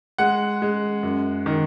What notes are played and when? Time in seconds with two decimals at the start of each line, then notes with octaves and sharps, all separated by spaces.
0.18 G#3 F#5
0.62 G#3
1.03 F#2
1.46 D#3